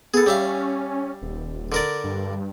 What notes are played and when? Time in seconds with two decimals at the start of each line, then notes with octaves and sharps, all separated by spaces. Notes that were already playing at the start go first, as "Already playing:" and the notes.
0.14 B3 G#4 A4
0.26 G3 C#4 E5 F5
1.22 D#1
1.72 D3 A#4 D5
2.04 G2